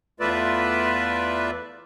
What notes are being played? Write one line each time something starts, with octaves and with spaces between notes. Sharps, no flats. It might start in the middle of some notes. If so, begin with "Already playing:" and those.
E2 A3 F4 B4 D5 E5